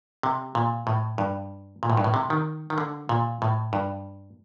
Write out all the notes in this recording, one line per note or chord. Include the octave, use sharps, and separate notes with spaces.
C3
A#2
A2
G2
A#2
A2
G2
A2
C3
D#3
D#3
D3
A#2
A2
G2